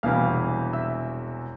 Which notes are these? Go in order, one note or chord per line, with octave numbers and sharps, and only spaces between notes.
E1 E2 C3 E3 G3 F5 F6
E5 E6